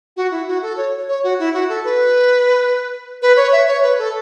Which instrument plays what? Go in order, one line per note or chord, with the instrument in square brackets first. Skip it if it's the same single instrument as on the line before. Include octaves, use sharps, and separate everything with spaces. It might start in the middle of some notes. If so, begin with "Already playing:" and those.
[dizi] F#4
E4
F#4
A4
C#5
C#5
F#4
E4
F#4
A4
B4
B4
C#5
E5
C#5
B4
A4